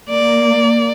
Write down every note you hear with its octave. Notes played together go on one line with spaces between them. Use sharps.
A#3 D5